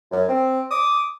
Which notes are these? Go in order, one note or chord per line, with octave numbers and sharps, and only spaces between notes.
F#2
C4
D6 D#6